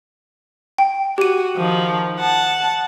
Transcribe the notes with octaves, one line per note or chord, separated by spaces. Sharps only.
G5
F#4 G4 D#7
D#3 F3
F#5 A5